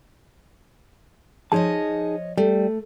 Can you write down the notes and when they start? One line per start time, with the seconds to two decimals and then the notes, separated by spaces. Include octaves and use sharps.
1.52 F3 D#4 G#4 C#5 D#5 A5
2.38 G3 A3